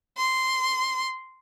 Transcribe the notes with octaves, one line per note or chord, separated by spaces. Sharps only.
C6